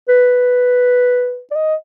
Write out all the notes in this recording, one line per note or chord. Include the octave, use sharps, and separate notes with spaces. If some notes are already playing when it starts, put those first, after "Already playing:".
B4
D5
D#5